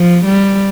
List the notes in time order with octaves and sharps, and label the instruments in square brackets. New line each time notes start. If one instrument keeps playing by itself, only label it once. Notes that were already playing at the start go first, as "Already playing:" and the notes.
Already playing: [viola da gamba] F3
G3